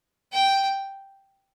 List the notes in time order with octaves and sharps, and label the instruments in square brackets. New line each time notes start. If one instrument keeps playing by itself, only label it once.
[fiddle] G5